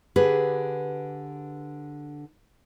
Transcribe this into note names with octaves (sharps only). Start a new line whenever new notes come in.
D3 G4 G#4 B4